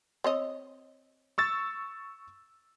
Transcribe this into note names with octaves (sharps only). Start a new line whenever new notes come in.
C4 C#5 D#5
C#6 E6 A6